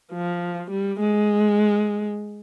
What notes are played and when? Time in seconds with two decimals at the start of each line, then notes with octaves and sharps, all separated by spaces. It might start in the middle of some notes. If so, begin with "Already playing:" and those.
0.13 F3
0.71 G3
1.00 G#3